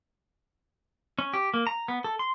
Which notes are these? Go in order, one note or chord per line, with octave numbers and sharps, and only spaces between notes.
C#4
G4
A#3
A#5
B3
A4
C6